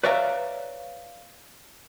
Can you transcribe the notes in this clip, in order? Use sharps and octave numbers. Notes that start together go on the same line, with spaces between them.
B4 C#5 D5 E5 F5 A#5